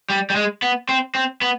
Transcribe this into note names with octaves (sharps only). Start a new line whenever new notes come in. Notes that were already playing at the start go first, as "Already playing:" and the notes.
G3
G3
G#3
B3
C4
C4
B3